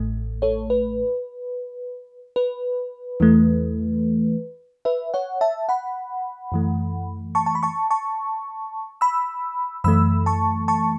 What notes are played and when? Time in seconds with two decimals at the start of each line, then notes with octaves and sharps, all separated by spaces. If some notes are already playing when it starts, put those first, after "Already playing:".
Already playing: A1 A2 A3
0.42 A4 C#5
0.70 B4
2.36 B4
3.20 E2 E3 A3
4.85 B4 E5
5.14 C#5 F#5
5.41 E5 A5
5.69 F#5 B5
6.52 F#2 E3 A3
7.35 A5 C#6
7.46 A5
7.55 B5
7.63 A5 C#6
7.91 A5 C#6
9.01 B5 E6
9.84 F#2 E3 A3 B5 E6
10.26 A5 C#6
10.68 A5 C#6